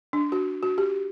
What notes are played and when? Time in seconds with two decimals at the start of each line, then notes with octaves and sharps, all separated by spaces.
0.13 D4
0.32 F#4
0.63 F#4
0.78 G4